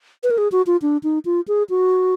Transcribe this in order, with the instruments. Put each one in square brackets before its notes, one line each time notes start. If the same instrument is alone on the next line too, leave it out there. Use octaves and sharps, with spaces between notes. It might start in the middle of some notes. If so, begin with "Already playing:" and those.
[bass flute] B4
A#4
G#4
F#4
F4
D4
D#4
F4
G#4
F#4